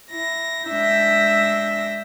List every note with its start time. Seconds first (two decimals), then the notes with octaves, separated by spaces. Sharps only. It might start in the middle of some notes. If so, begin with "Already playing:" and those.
0.11 E4 A#6
0.69 G#3 D4 E5 E6 G6 A#6